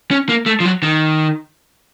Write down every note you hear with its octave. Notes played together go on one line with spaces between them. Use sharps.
C#4
A#3
A3
F3
F#3
D#3